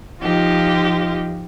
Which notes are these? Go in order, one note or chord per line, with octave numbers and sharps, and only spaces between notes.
F3 D#4 F4 G4 D#5